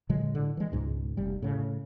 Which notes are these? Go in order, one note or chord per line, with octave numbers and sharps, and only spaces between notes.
A#2 D3 F#3 G#3
A2 D3
E3 G#3
C#2 G#2 B2
F1 C3 G3
A2 C#3